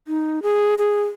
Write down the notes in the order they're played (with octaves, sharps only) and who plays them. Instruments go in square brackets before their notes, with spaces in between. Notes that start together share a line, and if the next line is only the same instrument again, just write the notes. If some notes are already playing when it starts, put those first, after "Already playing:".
[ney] D#4
G#4
G#4